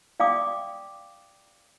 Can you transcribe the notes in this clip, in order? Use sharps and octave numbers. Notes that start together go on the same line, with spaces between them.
D5 F5 G5 D6 D#6